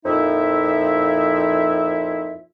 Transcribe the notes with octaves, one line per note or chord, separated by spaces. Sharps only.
F2 A#2 F3 D#4 E4 E5